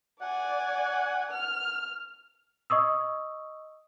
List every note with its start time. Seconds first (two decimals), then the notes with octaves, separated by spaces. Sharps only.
0.21 D5 F#5 G#5
1.31 F6
2.70 D#5 C#6 D#6 E6